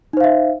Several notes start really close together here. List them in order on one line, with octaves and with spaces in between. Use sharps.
D#4 C5 F5 E5